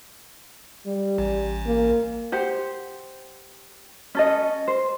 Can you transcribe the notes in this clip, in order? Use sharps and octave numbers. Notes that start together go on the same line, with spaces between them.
G3
A1
A#3
G4 C5 F#5
C#4 A4 D#5
C5